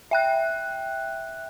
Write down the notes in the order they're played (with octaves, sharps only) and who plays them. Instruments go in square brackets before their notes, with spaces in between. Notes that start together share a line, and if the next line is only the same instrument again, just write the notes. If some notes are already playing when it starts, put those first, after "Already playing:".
[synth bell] E5 G5 F#6